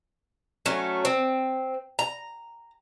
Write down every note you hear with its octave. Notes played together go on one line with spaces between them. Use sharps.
F#3 A3 C#4
C4
A#5